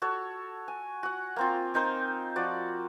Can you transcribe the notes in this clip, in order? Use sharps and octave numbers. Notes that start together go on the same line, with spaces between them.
F#4 A4 C#5
G#5
F#4 F#5
A#3 C4 F4
C4 D#4 A#4 C5
F3 F#4 D5